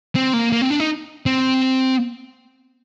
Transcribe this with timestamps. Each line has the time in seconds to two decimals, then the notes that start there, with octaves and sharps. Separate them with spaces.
0.15 C4
0.33 A#3
0.52 A#3
0.61 C4
0.70 D4
0.80 D#4
1.26 C4